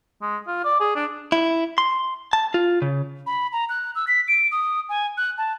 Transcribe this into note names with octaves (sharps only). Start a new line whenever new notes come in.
G#3
F4
D5
G#4
D4
E4
C6
A5
F4
C#3
B5
A#5
F#6
E6
B6
D7
D#6
G#5
F#6
A5